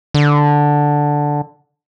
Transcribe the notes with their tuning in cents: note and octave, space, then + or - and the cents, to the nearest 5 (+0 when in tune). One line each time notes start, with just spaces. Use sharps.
D3 +0